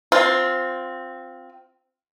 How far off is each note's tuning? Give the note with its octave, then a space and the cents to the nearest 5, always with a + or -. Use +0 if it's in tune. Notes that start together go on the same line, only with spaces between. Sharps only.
C4 +0 F4 +15